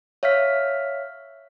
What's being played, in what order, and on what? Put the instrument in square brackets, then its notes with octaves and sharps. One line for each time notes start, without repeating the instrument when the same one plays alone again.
[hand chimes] C#5 E5 F5 F6 B6